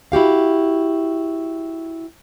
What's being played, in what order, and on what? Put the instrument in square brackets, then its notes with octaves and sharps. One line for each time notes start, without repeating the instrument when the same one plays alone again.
[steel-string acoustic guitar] E4 F#4 G4 F5